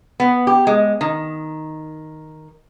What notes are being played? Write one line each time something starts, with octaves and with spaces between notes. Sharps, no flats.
B3
G4
G#3
D#3